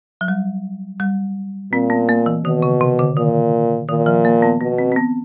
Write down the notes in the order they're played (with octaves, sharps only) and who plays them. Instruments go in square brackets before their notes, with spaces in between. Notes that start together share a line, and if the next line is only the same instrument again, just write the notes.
[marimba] F#3
G3
G3
[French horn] A#2 [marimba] C4
[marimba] B3
A#3
E3
[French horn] B2 [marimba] D#3
[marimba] C#3
C3
D3
[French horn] A#2 [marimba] D#3
[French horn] A#2 [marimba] D#3
[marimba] F3
A#3
B3
[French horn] B2 [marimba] B3
[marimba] C4
C4
B3